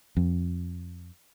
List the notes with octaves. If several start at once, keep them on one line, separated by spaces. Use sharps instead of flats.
F2